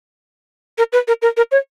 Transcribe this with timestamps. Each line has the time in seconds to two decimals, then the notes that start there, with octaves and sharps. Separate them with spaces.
0.78 A#4
0.93 B4
1.08 A#4
1.22 A#4
1.37 A#4
1.52 C#5